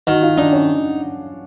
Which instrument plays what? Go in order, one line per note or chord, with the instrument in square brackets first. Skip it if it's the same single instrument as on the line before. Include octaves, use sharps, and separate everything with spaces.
[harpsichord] D#3 [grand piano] F#4 F#5
[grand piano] F4 F5
[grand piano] D4 D5 [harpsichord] D#4
[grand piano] C#4 C#5